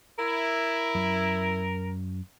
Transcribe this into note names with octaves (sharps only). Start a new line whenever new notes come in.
E4 A#4
F#2 F#3